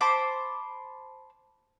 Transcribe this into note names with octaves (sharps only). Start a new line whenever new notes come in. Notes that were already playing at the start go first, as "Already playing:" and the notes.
C5 A5 B5 D6